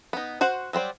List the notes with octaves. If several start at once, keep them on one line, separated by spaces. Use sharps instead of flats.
B3 D#4
F#4 C5 F#5
F#3 G3 C5 D5